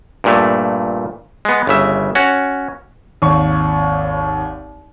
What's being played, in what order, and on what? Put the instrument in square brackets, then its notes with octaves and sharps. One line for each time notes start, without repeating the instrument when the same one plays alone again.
[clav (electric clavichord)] G2 A#2 A3
G#3 B3
G1 C#3 E5
C#4 F#4
[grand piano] G#1 D#2 C#5 C#6